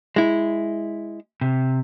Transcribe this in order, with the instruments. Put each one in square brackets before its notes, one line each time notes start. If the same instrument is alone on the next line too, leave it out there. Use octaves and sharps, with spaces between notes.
[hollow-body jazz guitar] G#3 E4
[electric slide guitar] C3